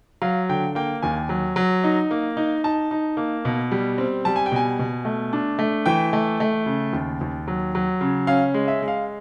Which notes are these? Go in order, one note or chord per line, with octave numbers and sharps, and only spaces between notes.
F#3 F5
D3 G5
A#3 G5
D#2 G#5
F#3
F#3
D#4
A#3
D#4
D#4 A5
D#4
A#3
B2
G3
C4
G3 A5
G#5
G5
B2 G#5
B2
A3
D4
A3
E3 G5
A3
A3
C#3
D#2
D#2
F#3
F#3
C#3
C#4 F5
G#3
E5
G#3
F5